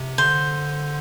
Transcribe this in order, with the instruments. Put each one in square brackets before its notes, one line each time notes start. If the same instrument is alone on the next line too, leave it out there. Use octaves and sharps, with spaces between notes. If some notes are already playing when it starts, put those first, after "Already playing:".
Already playing: [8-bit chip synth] C3
[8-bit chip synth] D3 [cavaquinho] C5